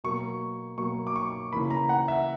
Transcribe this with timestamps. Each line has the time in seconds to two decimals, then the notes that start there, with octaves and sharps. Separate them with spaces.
0.04 B2 F#3 A#3 C#6
0.78 B2 F#3 A#3 C#6
1.07 D6
1.16 C#6
1.53 C#3 E3 A#3 B5
1.70 A#5
1.89 F#5
2.08 E5